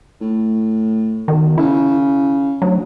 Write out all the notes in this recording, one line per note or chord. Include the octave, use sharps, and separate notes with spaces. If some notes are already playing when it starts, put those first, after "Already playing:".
A2
B2 D#3
C#3 E4
D2 F#3